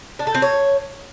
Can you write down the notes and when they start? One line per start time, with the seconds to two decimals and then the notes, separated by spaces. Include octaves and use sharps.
0.19 D4
0.27 A4
0.35 C4
0.42 C#5